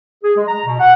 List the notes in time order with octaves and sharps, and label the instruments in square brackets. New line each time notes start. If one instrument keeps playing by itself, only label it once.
[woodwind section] G#4
G#3
A#5
B2
F#5